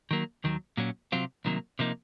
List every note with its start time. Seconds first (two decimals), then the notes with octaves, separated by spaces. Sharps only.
0.11 D#3 F#3 A#3
0.44 D#2 D#3 F#3
0.77 A#2 F#3 C#4
1.12 C3 F#3 C4 F4
1.45 C2 C3 D#3 F#3 A#3
1.79 C3 F3 A#3 D#4